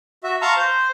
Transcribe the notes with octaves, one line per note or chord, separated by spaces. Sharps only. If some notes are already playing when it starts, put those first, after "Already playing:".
F#4 E5
F5 A5 A#5 C6 C#6
C5